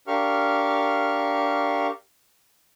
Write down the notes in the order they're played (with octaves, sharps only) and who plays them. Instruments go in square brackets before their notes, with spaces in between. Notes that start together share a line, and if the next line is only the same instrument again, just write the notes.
[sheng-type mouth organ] D4 G4 A#4 F5 C#6 F6